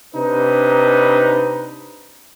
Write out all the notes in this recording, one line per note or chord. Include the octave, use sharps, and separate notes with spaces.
C3 D4 D#4 B4